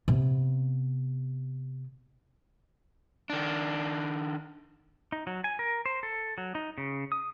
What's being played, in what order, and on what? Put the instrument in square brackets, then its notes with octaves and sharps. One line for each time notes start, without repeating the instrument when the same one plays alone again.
[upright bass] C3 B3
[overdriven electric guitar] D#3 D4
[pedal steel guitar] D#4
F#3
G#5
A#4
C5
A4
F#3
D#4
C#3
D#6